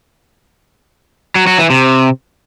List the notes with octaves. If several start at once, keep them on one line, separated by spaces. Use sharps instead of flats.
F#3
F#3
E3
C3